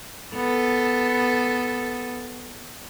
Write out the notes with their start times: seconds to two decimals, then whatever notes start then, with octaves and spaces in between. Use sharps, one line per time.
0.34 B3 A4